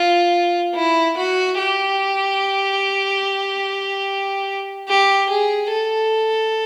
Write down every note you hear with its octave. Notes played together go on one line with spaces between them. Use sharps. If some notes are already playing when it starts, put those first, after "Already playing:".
Already playing: F4
E4
F#4
G4
G4
G#4
A4